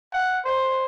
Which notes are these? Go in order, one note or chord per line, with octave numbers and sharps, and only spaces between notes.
F#5
C5